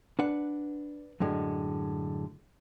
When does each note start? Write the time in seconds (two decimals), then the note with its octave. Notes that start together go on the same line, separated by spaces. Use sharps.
0.19 D4 B4 F#5
1.20 F#2 A2 D3 G#3